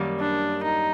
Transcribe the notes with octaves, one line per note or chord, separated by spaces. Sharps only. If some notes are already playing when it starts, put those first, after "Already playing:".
Already playing: F#2 D#3 G3 A#3
D4
D#4